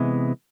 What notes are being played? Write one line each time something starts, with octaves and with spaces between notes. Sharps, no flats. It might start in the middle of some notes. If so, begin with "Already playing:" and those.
Already playing: C3 E3 G#3 B3